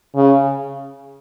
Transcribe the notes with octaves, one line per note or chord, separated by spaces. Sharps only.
C#3